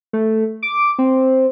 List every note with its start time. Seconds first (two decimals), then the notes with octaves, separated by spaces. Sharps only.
0.13 A3
0.63 D6
0.99 C4